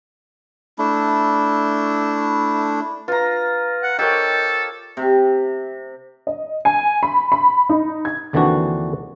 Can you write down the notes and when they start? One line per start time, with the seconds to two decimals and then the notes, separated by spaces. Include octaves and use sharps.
0.79 A3 D4 E4
3.08 F4 B4 A#5
3.83 F#5
3.99 G4 A4 A#4 C5 C#5 D#5
4.97 C3
6.27 D#5
6.65 G#5
7.03 B5
7.32 B5
7.69 D#4
8.05 G#6
8.33 D#2 D3 E3 C4 D4 F#4